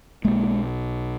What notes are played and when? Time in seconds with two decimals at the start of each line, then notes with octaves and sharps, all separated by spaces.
0.25 B1 B2 G#3 A#3